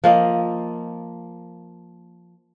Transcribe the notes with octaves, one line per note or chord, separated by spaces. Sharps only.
F3 A#3 D#5